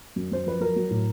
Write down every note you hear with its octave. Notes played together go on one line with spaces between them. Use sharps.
F#2
F#2 C5
F3 B4
F#3 A#4
F#3
A2